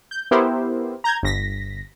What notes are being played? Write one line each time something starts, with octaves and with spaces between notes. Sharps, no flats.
G6
B3 E4 G4 A#4 C5
A#5 G6 G#6
G1 A#6 B6